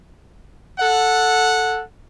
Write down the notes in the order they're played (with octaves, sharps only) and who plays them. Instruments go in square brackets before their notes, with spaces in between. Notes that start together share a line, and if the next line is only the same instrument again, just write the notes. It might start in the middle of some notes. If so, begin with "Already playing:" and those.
[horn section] A4 F#5